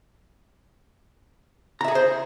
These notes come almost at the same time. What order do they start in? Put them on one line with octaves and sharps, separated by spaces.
A#5 E5 G#4 A4 C5